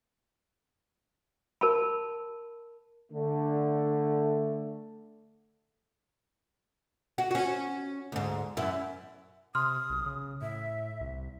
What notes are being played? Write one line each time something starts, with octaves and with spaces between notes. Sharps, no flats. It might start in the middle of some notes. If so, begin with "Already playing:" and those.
A#4 A5 B5
D3 A3
F#4
C#4 F#4
D2 G#2
F#2 E4
C3 C6 D#6 F6
B1
C#3
A2 E5
C2